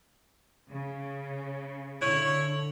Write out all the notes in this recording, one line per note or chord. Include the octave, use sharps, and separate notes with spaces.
C#3
D3 E4 C#5